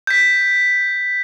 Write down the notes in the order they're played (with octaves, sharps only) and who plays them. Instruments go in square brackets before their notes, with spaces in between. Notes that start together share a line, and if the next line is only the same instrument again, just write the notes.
[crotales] G6 B6